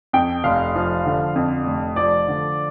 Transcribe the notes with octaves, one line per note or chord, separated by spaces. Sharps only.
F2 G5
F1 F5
F3
D3
F2
F1
F3 D5
D3